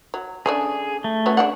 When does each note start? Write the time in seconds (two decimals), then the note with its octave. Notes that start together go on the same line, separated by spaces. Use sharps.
0.14 F#3
0.46 C#3 A3 D4 G#4
1.04 A3
1.26 F#3 B3 C#4
1.37 C#3 D4 F#5